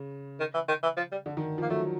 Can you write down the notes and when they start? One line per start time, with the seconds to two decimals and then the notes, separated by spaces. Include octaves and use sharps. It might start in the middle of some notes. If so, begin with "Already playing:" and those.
Already playing: C#3
0.39 D#3
0.54 E3
0.68 D#3
0.83 E3
0.97 F3
1.12 G3
1.26 D3
1.37 D#3
1.58 F3
1.62 A#3
1.70 F#3 A3